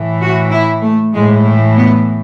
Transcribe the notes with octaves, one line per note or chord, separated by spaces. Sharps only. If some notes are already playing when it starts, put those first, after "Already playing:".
Already playing: A2 E3
F#4
E4
A3
A2 E3 G#3
A3
B3